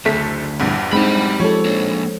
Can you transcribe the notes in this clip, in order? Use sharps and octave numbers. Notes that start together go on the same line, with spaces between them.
F#1 D2 A3 B6
A#1 E2 G2
G#3 C4 D#4 G4 B5
F3 G#3 A4 C#5
A#3 D4